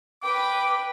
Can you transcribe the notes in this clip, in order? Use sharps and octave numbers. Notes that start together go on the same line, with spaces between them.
B4 G5 D6